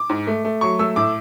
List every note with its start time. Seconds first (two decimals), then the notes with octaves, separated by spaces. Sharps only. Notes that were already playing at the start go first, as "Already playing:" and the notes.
Already playing: D6
0.10 G#2
0.27 A3
0.45 A3
0.61 F#3 C#6
0.79 A3 E6
0.96 A2 D6